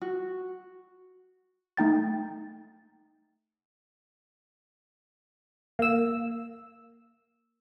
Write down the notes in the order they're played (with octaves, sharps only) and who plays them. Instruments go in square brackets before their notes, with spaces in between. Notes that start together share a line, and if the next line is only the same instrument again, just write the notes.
[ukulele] F#4
[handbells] A3 D#4 G5 A6
[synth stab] A#3 E6